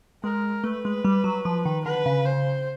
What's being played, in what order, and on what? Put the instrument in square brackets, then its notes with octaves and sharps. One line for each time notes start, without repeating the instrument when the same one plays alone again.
[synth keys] G#3 [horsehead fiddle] A#4
[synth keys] A3 [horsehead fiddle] B4
[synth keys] G#3
G3
F#3
F3
D#3
[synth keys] D3 [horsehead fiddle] B4
[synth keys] C#3
[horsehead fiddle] C5